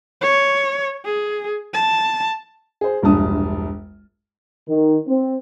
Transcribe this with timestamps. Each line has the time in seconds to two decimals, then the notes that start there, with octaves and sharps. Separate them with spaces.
0.21 C#5
1.05 G#4
1.74 A5
2.81 G#4 C5
3.03 E1 A#1 G2 A5 D#6
4.69 D#3
5.07 C4